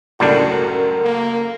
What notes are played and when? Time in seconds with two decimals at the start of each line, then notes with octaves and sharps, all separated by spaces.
0.20 C#2 F#2 A2 G3 A3 D4 F#4 A#4
1.04 A#3